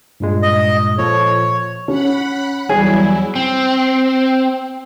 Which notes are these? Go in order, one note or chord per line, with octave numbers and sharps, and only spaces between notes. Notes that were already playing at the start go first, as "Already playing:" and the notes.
G2 A#2 G#3
D#5
A#2 F3 A4 C#5
C#4 F#5 B5 F#6
E2 F#3 G3 E4 G#4 C#5
C4